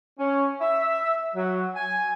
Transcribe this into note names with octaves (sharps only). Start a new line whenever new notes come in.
C#4
E5
F#3
G#5